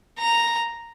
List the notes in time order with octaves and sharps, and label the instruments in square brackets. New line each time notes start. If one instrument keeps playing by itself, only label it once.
[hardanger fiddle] A#5